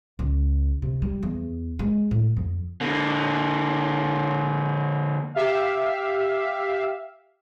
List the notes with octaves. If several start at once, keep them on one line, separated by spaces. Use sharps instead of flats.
C#2
C3
G3
E2
G#3
A2
F2
D3 A#3
G4 E5 F5